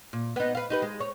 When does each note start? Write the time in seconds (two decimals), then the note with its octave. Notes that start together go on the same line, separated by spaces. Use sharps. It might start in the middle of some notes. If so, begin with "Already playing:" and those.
0.13 A#2
0.36 B3 D#4
0.55 B4 F5
0.70 D#4 G4 B4
0.82 G#3
1.00 C#5